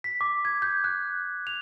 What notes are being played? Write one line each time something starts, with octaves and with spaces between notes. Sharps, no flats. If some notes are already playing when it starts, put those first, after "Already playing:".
B6
D6
G#6
G6
F#6
F7